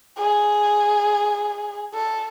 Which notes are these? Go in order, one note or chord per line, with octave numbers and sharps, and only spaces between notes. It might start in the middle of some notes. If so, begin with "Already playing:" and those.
G#4
A4